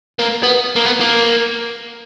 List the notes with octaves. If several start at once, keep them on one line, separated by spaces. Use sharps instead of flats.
A#3
B3
A#3
B3
A#3